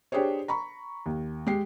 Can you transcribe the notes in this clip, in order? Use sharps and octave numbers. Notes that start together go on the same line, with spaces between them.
D4 G4 G#4 C5 C#5
A#5 B5 C#6
D#2
G#3 G4 C7